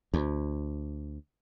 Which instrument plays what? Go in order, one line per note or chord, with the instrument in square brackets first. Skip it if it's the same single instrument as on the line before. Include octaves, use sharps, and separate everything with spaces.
[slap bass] D2